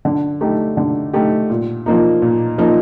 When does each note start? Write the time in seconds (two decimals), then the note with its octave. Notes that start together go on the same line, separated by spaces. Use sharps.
0.05 D3
0.41 A3 D#4 G4
0.77 D3
1.13 A3 D#4 G4
1.50 A#2
1.86 F3 A#3 D#4
2.22 A#2
2.58 F3 A#3 D#4